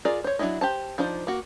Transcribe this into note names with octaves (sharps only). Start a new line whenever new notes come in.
F4 G#4 A#4 D5
C5 C#5
F#3 C#4 D4 E4 D#5
G4 C5 A5
F3 D4 D#4 C5
A#3 F#4